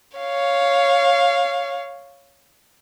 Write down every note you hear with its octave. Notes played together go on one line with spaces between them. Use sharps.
C#5 F5